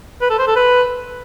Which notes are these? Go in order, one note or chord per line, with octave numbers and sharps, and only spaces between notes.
B4
A4
C5
A4
B4